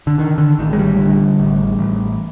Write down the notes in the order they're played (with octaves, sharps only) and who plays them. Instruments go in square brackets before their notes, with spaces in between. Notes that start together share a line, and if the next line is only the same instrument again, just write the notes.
[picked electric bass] D3
D3 D#3
D3
A1 D#3
G#3
G3
D3
A1
A1